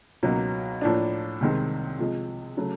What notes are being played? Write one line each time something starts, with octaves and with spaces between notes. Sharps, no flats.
C#2 B2 F#3 A#3 D#4
A2 F3 A#3 D4
C2 C3 D#3 G#3 C4
C3 F3 G#3
C#3 F#3 A3